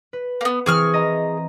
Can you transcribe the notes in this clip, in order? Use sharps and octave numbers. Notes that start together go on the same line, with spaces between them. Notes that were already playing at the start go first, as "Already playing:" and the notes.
B4
A#3 B3
E3 C4 G#4 C#6 F6
D#5 A#5